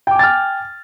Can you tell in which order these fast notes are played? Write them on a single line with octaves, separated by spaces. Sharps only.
G5 D6 G#5 A6 F6